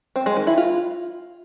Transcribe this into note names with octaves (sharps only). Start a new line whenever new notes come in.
C4
G#3
D#3
E4
F4